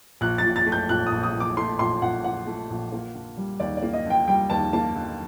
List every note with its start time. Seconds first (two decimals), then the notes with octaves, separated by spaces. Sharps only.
0.21 A#1 F#6
0.38 A6
0.44 A#2
0.56 A6
0.66 A3
0.72 G6
0.89 A#1 F#6
1.06 D#6
1.12 A#1
1.23 D#6
1.35 A#2
1.40 D6
1.57 A3 C6
1.79 A#1 C6
2.02 A#1 F#5
2.24 A#2 F#5
2.47 A3
2.70 A#1
2.92 A#3
3.15 D3
3.37 G3
3.60 D#2 D5
3.77 D5
3.83 A#3
3.93 D#5
4.06 D3 G5
4.28 G3 G5
4.50 D#2 A5
4.73 A#3 A5
4.95 D3